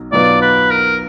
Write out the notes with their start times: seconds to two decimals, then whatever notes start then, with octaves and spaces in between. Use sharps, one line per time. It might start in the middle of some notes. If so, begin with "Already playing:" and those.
Already playing: B1 B2 F#3
0.12 B1 B2 F#3 B3 F4 D5
0.42 B4
0.70 A#4